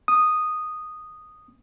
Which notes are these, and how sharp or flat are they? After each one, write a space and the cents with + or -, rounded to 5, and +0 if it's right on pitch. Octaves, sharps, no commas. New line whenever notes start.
D#6 -10